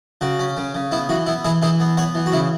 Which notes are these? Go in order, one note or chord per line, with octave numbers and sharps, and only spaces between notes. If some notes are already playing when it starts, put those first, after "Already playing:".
C#3 F#4
C#4
C#3
C#3
B3 E4
E3 F#4
B3 E4
E3 E4 G#4
E3 E4 G#4
B3
B3 C#5 F#5
E3
F#4
C#3 E4